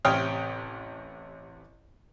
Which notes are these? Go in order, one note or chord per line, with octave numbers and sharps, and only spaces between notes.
A1 C3 C#5 G5 D#6 F6